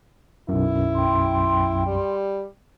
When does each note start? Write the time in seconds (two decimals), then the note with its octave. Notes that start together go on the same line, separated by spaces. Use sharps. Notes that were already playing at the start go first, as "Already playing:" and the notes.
0.49 B1 F#2 E4
0.95 G5 C6
1.86 G3